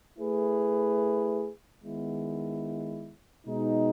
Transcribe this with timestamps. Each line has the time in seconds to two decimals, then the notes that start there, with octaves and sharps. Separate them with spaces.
0.18 A3 E4 G#4 B4
1.83 D#3 G#3 B3 E4
3.47 B2 G#3 D#4